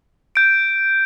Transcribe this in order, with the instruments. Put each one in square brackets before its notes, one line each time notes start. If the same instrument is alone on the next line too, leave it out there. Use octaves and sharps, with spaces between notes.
[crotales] G6 D7